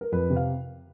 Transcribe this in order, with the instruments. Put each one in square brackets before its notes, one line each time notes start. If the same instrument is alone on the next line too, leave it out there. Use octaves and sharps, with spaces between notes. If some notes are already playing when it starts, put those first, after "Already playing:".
[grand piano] A#4
F2 B4
C3
F5